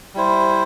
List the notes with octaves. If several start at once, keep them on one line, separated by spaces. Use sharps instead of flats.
G3 E4 C5